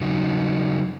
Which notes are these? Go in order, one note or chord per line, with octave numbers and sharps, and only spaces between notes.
C#3 F#3 D#4 F#4